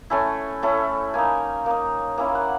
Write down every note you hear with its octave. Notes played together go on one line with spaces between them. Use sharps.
A3 C#4 E4 G#5
A3 C#4 E4
A#3 D#4 G#5
A#3 D#4
A#3 C#4 E4
F#5